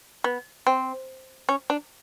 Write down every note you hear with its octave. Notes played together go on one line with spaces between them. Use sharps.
B3
C4
C#4
D4